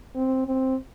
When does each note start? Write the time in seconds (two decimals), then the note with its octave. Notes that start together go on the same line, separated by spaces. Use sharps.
0.15 C4
0.47 C4